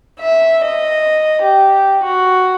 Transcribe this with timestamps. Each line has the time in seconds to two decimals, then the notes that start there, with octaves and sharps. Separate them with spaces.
0.20 E5
0.67 D#5
1.44 G4
2.05 F#4